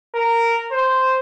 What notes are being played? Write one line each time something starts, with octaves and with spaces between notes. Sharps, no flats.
A#4
C5